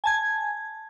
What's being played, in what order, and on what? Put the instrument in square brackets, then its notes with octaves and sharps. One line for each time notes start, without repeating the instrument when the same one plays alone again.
[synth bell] G#5 A5 G#6